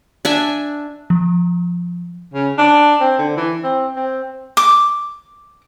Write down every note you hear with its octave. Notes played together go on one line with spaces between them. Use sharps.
D4 E5 G#5
F3
C#3
D4
C4
D3
E3
C4
C4
D6